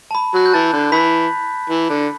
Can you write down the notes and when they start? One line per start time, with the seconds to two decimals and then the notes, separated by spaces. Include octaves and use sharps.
0.11 A5
0.15 B5
0.34 F#3 F#6
0.46 G6
0.53 E3 A5 A6
0.73 D3
0.92 E3 B5 B6
1.70 E3
1.90 D3